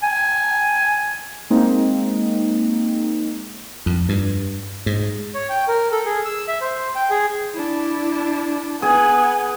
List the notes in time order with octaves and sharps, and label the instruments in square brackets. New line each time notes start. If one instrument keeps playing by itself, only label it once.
[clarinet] G#5
[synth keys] G#3 A#3 C4 D#4
[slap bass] F2
G2
G#2
[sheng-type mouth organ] C#5
G5
A#4
A4
G#4
E6
E5
C5
G5
G#4
[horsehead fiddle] D4 E4
[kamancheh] B3 [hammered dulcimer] G#4 [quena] G#5